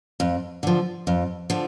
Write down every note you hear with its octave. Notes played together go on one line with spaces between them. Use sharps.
F2
D3 F3
F2
D3 F3